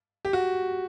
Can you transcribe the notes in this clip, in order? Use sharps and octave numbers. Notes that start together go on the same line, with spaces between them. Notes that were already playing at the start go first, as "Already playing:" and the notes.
G4
F#4